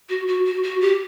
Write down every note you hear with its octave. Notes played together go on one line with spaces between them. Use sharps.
F#4
F#4
F#4
F#4
G4